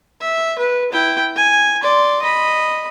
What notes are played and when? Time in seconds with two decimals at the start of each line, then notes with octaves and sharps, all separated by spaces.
0.21 E5
0.59 B4
0.92 E4 G5
1.36 G#5
1.83 D5 C6
2.22 D#5 B5